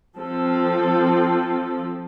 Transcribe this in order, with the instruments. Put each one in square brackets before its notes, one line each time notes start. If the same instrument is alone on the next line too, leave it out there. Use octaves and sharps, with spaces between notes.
[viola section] F3 C4 A4